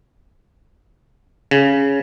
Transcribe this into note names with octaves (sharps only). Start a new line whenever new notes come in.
C#3